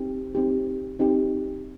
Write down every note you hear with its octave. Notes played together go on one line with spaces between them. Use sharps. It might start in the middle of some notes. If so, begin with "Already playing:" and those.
Already playing: C4 D#4 G4
C4 D#4 G4
C4 D#4 G4